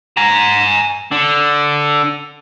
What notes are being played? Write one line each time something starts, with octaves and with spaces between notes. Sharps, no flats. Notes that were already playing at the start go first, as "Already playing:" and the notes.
G#5 A#5
D3